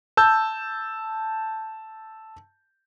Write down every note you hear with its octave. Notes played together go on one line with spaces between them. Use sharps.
A5 E6 G6